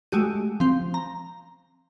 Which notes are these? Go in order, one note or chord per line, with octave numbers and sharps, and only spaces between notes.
G#3 A3 F#4 G4 D#7
F3 C4
A#5